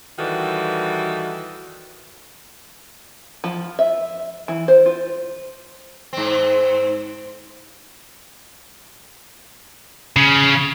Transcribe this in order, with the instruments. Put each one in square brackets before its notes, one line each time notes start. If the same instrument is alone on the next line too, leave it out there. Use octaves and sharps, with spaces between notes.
[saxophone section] D#3 E3 G3 F#4 A4
[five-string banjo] F3
E5
E3
C5
F4
[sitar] G#2 C4
[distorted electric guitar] C#3